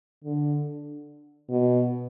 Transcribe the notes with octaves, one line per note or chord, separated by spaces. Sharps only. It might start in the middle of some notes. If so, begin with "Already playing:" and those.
D3
B2